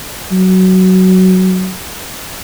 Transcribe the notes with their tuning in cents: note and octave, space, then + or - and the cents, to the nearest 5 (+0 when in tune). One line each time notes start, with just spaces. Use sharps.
F#3 +10